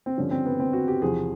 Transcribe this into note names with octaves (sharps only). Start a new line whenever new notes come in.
C4
G2 D3 F3 C#4
C4
B3
C4
F#4
G4
E2 C3 F3 G#4